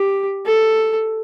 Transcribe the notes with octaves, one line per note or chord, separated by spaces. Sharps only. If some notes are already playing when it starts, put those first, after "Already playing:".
Already playing: G4
A4